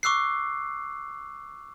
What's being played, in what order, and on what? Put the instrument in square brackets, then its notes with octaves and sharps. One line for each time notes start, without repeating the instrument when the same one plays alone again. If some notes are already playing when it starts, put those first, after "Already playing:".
[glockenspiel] C#6 D6 E6 F#6 C7